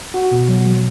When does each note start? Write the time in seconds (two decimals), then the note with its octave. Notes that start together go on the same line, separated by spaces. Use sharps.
0.14 F#4
0.31 B2
0.49 F#3
0.66 F#3